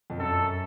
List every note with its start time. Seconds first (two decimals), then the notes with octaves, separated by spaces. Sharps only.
0.10 F2
0.19 F#2 A4